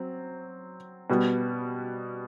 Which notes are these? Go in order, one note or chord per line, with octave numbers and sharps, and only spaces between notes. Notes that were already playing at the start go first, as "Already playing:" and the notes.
Already playing: F#3 C4
B2 G3 B3